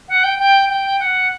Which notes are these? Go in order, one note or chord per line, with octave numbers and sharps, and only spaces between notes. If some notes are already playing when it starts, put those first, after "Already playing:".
F#5
G5
G5
G5
F#5